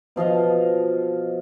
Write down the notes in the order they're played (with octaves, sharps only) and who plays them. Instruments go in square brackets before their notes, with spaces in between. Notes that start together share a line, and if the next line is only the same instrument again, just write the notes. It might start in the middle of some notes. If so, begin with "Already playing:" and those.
[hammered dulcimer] B2 F3 D#5 F5